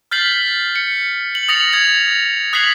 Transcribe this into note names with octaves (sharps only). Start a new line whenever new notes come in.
F6 G6 A6 B6 C7 F#7
C#7
F#7
D#6 A6 A#6 C#7 F7 F#7
D#6 G#6 A6 F7
D#6 F#6 G#6 B6 C7 F#7